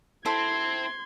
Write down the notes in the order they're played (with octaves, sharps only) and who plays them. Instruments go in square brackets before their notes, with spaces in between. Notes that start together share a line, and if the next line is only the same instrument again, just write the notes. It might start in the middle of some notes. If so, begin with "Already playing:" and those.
[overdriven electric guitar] C4 [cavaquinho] E4 A4 C5 [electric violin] C6 G#6